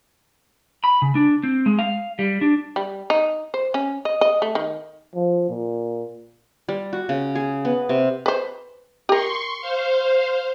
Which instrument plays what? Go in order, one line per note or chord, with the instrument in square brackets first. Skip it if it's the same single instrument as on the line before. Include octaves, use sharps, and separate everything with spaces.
[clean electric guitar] B5
C#3
D4
C4
G#3
F5
G3
D4
[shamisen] G3
D#4
C5
C#4
D#5
D#5
A3
D#3
[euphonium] F3
A#2
[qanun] G3
F#4
C#3
G#4
B3
C3
[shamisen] B4 C5
[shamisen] G4 A#4 [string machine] C6 C#6
[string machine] C5 F5